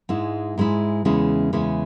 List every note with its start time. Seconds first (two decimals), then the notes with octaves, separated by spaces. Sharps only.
0.09 G#2 G#3 E4
0.58 G#2 G#3 E4
1.05 E2 C#3 G#3 C#4 E4
1.53 E2 C#3 G#3 C#4 E4